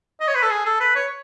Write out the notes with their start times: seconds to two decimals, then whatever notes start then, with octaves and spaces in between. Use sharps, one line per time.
0.20 D#5
0.28 C#5
0.35 B4
0.42 A4
0.50 G#4
0.65 A4
0.80 B4
0.95 C#5